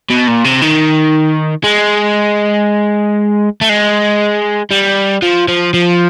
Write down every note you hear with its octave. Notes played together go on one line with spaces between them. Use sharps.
B2
A#2
C3
D#3
G#3
A3
G#3
G3
F3
F3
F3